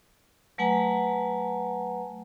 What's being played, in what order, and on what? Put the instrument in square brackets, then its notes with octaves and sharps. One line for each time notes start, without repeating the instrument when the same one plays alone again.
[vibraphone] F#3 A3 B4 F#5 G#5 A#5